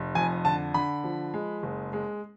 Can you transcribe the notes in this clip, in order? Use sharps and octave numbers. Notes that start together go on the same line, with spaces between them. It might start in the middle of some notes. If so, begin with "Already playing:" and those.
Already playing: F1
F2 G#5
D3 A5
D3 B5
F3
G#3
F#1
G#3